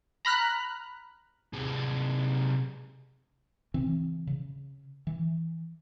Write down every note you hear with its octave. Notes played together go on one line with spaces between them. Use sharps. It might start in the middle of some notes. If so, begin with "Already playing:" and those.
A#5 B5 F6 F#6
C3 G#3
C#3 E3 C4
C#3
E3